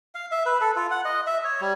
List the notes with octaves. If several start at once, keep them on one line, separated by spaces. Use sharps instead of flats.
F5
E5
B4
A4
F4
F#5
D#5
E5
C#5
G3